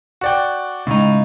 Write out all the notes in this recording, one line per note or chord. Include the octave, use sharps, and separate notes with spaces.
F#4 D5 G5
C#2 A2 D#4